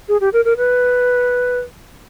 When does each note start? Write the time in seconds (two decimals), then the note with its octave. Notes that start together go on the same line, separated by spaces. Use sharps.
0.08 G#4
0.21 G4
0.33 A#4
0.45 A#4
0.57 B4